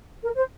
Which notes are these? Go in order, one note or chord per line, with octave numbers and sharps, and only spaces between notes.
A#4
C5